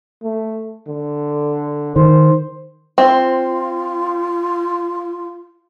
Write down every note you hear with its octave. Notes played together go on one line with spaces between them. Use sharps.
A3
D3
D#3 C5
C4 F4